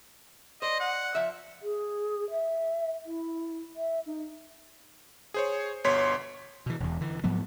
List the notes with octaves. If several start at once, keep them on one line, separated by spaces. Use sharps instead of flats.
C5 D5 D#5
F#5
F3 E5
G#4
E5
E4
E5
D#4
G#4 C5 C#5
G1 B2 C#5 C6 B6
B2 E3
E1 E2
D3 E3
G#2 F3 F#3 B3